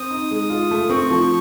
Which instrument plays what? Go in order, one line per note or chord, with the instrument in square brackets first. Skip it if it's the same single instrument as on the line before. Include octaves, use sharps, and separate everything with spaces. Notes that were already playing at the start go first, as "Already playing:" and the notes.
Already playing: [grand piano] C4 [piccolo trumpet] D#6
[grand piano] D#4
G#3
F4
A3
[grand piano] C4 [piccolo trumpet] C#6
[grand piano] F3